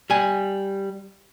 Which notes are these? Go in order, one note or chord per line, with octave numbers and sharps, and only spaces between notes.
G3 G#5